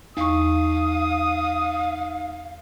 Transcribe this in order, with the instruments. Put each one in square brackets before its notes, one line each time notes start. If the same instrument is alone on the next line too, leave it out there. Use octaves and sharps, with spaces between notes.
[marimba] E2 C#6 [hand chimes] D#4 [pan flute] F5 [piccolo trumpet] D#6